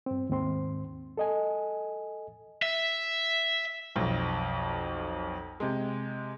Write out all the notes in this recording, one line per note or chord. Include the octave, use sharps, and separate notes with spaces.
G2 C4
D#2 G#2 C4 C6
A4 D#5 G#5
E5
B1 F2
C3 G#3